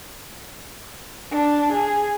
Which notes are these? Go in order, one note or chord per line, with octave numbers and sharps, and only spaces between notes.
D4
G#4